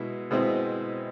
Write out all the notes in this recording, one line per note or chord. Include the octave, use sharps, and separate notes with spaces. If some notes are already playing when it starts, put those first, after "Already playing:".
Already playing: B2 G#3 E4
B2 G#3 C4 E4